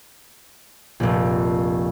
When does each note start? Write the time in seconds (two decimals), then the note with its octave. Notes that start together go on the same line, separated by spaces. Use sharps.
1.00 F1 A#1